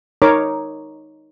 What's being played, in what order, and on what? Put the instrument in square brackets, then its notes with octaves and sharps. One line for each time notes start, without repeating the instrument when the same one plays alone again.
[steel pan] D#4 A#4 C#5 D6